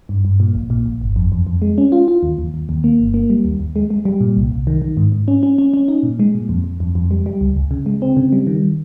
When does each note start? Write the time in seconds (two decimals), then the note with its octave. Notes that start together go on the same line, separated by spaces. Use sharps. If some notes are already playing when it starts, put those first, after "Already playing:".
0.09 G2
0.25 G2
0.40 A#2
0.55 A#1
0.70 A#2
0.86 A#1
1.01 G1
1.16 F2
1.32 F2
1.47 F2
1.62 G#3
1.78 C#4
1.92 F4
2.08 F4
2.23 D#2
2.39 D#2
2.54 D#2
2.69 D#2
2.84 A#3
3.00 G1
3.14 A#3
3.30 G3
3.45 D#2
3.60 D#2
3.76 G#3
3.90 G#3
4.05 G3
4.21 A#2
4.37 C2
4.52 C2
4.67 D#3
4.82 D#3
4.97 G#2
5.12 G#2
5.28 C#4
5.43 C#4
5.58 C#4
5.74 C#4
5.88 D#4
6.03 A#2
6.19 G#3
6.35 A#2
6.49 F2
6.64 F2
6.80 F2
6.95 F2
7.11 G3
7.26 G3
7.41 C#2
7.56 C#2
7.71 C#3
7.86 G#3
8.02 C4
8.17 C#3
8.33 G3
8.47 D#3